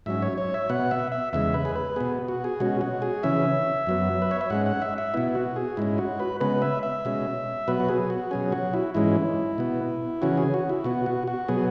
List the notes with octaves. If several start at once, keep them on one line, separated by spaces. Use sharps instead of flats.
G#2 F#3 C#4 E5
C#5
C#5
E5
B2 B3 F#5
E5
E5
E2 C#3 G#3 E5
B4
G#4
B4
B2 B3 G#4
F#4
G#4
B2 G#3 C#4 F#4
F#4
G#4
C#3 E3 C#4 E5
F#2 F#3 B3
B4
C#5
E5
G#2 G#3 C#4 F#5
F#5
E5
E5
B2 B3 E4
F#4
G#4
G#2 G#3 C#4 E4
F#4
B4
C#3 G#3 B3 B4
E5
E5
B2 G#3 C#4
B2 F#3 B3 B4
F#4
G#4
F#4
B2 F#3 C#4 G#4
F#4
E4
G#2 E3 G#3 C#4 E4
B2 B3
C#3 E3 C#4 F#4
G#4
F#4
E4
B2 B3 F#4
F#4
F#4
B2 F#3 B3 G#4